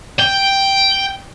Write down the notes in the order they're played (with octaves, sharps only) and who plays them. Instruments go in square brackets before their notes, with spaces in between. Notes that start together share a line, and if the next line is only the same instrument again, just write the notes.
[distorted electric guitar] G5